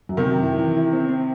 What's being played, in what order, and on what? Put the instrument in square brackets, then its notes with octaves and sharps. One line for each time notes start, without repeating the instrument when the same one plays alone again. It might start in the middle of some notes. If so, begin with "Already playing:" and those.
[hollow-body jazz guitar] F#2
[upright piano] C3 D#3
[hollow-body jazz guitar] F#2
E4
E3
E4
C4
C4